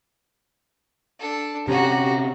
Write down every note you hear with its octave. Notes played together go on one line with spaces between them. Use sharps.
D4 A4
C3 C4 C#4 F#4 G4 A#5